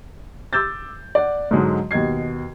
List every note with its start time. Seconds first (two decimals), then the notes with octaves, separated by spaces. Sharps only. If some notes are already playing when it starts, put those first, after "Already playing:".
0.53 D6 E6 G6 A6
1.15 D5 F#5
1.51 G#2 D3 F#3 G#3
1.91 D#2 B2 D#5 G#6 C7